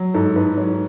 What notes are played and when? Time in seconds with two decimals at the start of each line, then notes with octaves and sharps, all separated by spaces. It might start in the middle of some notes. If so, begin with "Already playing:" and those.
Already playing: F#3
0.14 G#2 A4
0.35 G#2 B4
0.57 F#3 C#5